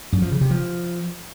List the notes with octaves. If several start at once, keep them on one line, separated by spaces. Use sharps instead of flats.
F#2
F3
C#3
C3
F3